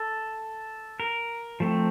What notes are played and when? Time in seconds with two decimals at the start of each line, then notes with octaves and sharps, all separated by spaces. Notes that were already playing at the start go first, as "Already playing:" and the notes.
Already playing: A4
1.00 A#4
1.60 F3 A3 C4